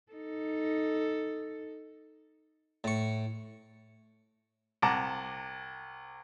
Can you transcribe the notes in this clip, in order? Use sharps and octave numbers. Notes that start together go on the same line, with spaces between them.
D#4 A4
A2 C#6
C2 F#5 A5 A#5 D6